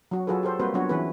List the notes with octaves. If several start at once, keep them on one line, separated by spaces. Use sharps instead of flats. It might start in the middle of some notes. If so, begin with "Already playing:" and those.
F#3 F#4
F#3 F4 F#4 G#4 A4 B4
G4 A4 C5
G3 A#3 C4 F#4 B4 C5
F#3 B3 D4 F4 F#4 C#5
E3 C#4 E4 G#4 B4